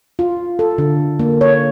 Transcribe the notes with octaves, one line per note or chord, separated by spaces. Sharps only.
F4
A4
D3
A#3
C#5